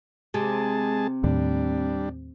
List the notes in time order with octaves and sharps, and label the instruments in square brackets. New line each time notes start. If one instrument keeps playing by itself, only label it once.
[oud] C3 [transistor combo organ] G#3 G#4 A5
[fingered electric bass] D#2 A2 [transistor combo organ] G3 D4